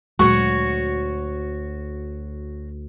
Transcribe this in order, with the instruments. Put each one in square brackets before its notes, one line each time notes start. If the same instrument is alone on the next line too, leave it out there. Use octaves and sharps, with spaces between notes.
[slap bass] D2 [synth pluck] A#2 F#3 G#3 [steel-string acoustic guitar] F#4 C#5 [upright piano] C#6